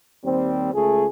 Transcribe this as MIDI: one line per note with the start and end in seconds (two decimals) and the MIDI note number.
0.24 0.72 39
0.24 0.72 55
0.24 0.72 60
0.73 1.06 37
0.73 1.06 57
0.73 1.06 68